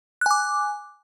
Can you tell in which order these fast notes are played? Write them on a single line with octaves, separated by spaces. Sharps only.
F#6 G#5 D6